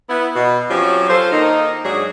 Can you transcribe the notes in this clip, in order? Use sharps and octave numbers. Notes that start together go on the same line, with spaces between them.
B3 E4
B2
F3 F#3 C4 C#4 G4
F4 A4 C5
D#3 A#3 D#4
G#2 F#3 D4 G#4